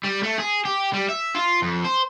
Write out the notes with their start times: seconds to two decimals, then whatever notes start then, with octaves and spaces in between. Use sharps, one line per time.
0.05 G3
0.23 A3
0.38 G#4
0.65 G4
0.94 G3
1.10 E5
1.35 F4
1.62 F2
1.85 C5